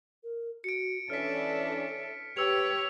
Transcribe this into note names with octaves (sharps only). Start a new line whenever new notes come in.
A#4
F#4 C#7 D7
E3 C#4 D4 A4 C#5 E5 F6 B6
G4 B4 C#5 E6 F7